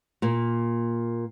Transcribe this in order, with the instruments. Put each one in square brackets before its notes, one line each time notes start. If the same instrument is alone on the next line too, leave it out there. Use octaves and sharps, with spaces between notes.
[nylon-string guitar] A#2 A#3